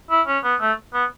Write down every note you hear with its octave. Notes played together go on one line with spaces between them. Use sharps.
E4
C#4
B3
A3
B3